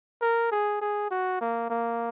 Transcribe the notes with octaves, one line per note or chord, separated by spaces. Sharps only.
A#4
G#4
G#4
F#4
A#3
A#3